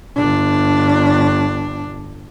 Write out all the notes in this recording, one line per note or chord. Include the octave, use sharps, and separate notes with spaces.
G1 D4